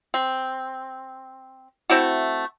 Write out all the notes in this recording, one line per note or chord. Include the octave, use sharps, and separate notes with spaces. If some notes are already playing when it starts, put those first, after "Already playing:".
C4
A3 C4 E4 F#4